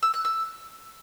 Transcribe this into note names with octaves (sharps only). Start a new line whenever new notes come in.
E6
F#6
E6